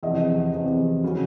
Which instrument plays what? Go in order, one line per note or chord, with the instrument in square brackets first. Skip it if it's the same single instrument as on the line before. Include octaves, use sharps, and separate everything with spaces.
[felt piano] E2 C3 F3 D#5
E2 C3 F3
C#3 F#3